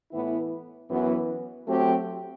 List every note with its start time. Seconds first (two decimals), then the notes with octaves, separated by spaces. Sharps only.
0.12 A2 E3 B3 E4
0.90 F#2 E3 B3
1.67 F#3 A3 C4 G4